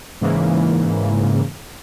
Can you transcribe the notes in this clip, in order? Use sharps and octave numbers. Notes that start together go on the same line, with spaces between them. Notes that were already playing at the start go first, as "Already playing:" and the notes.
G#2 C#3 E3 A#3